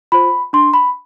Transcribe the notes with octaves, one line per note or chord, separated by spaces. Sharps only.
F4 C5 B5
D4 C6
B5